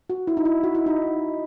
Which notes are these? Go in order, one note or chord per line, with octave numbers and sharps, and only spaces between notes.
F#4
E4
D#4
E4
F#4
E4
D#4